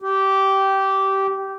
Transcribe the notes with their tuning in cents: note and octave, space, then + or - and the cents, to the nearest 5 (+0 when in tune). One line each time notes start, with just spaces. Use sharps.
G4 -15